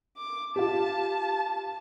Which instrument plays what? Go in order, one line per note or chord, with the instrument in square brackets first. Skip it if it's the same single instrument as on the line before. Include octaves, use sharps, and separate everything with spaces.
[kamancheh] D6
[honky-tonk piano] F4 G4 [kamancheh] A5